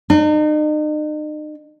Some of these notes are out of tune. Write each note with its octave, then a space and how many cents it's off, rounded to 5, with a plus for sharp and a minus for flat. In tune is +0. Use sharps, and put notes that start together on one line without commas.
D#4 -40